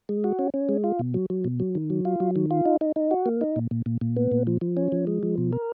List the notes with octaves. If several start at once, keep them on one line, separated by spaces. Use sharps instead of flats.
G#3
F#4
C#4
C#4
G#3
F4
B2
F#3
F#3
B2
F#3
D#3
F#3
F4
F#3
D#3
F4
D#4
D#4
D#4
F#4
A#3
D#4
A#2
A#2
A#2
A#2
B3
A#2
F3
F3
C#4
F3
G#3
F3
B2
A#4